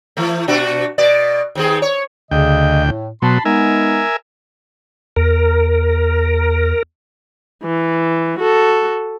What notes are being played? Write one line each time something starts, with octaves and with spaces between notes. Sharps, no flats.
E3 A3
B2 D4 F#4
B2 D5
D#2 C4 G#4
C#5
D2 C#3 D#5 G5
A2
B2 F#3 A5 B5 C6
G#3 B3 D#4 A#4 E5 G#5
E2 A#4
E3
F#4 A4